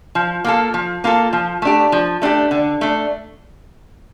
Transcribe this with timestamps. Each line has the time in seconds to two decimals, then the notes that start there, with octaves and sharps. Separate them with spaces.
0.15 F3
0.44 A#3 F4 A4
0.74 F3
1.04 A#3 F4 A4
1.33 F3
1.62 A3 D4 G4
1.92 F3
2.22 A3 D4 G4
2.51 D3
2.81 A3 D4